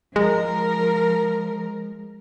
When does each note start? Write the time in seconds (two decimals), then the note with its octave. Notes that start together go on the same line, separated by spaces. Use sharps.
0.16 F3 G#3 A#4